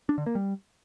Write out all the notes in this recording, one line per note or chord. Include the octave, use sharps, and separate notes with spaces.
D4
D3
A#3
G3